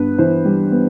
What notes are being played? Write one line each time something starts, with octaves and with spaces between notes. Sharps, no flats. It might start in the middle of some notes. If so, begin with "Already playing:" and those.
Already playing: G2 B3 B4
E3 C5
G3
B3